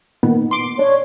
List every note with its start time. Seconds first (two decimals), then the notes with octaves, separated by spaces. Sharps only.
0.23 A#2 D#3 B3
0.51 C6 D6
0.79 D4 C#5